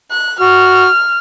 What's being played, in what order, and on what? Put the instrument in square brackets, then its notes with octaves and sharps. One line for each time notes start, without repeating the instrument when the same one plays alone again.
[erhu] F#6
[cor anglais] F#4 [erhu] F6